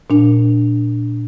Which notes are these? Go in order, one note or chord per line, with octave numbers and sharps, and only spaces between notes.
A#2 D4